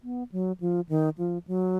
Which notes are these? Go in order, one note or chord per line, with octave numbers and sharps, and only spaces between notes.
B3
F#3
F3
D#3
F3
F#3